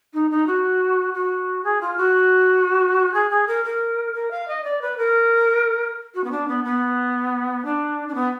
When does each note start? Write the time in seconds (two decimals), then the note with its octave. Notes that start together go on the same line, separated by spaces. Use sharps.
0.14 D#4
0.31 D#4
0.47 F#4
1.14 F#4
1.64 G#4
1.81 F4
1.97 F#4
3.14 G#4
3.30 G#4
3.47 A#4
3.64 A#4
4.14 A#4
4.31 F5
4.48 D#5
4.64 D5
4.81 B4
4.97 A#4
6.15 F#4
6.24 B3
6.31 D4
6.48 B3
6.64 B3
7.65 D4
8.08 D4
8.14 B3